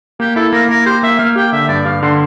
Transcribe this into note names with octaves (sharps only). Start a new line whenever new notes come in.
A#3 G4
E4 A4
A#3 A#4
A#3 A#4
G4 C5
A#3 E5
A#3 F5
G4 G5
D3 E5
G2 D5
G2 F5
D3 C6